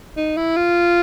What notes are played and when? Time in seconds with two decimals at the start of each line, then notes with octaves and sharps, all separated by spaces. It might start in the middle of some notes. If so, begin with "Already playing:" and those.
0.17 D#4
0.37 E4
0.57 F4